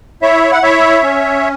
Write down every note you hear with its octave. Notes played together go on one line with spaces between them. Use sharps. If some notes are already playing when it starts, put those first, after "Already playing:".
E4 C#5 E5
F#5
E4 C#5 E5
C#4